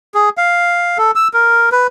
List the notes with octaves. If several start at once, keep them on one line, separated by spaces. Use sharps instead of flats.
G#4
F5
A4
E6
A#4
B4